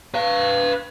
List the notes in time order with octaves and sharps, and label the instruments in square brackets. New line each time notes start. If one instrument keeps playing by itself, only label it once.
[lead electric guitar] B4 F5